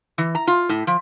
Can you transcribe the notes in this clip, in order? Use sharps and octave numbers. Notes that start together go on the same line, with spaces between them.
E3
A#5
F4
A2
F3